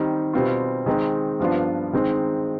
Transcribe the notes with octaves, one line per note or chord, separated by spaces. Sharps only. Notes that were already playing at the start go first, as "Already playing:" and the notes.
Already playing: D#3 G3 C4 D#4
B2 G3 C4 F4
D#3 G#3 C4 D#4
G2 F3 B3 D4 F4
D#3 G#3 C4 D#4